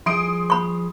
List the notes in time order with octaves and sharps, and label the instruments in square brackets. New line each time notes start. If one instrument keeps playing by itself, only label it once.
[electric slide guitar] F3 G3 G#4 [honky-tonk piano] C6 D#6 D7
[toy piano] B5 C#6